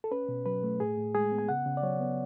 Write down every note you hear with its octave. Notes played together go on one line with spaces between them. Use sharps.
A4
C#4 B4
B2
F#3 B4
A3
A2 G#4
A2
G#3 G#4
B3
G#5
C#3 F#5
C#3
D5
F#3 C#5
B3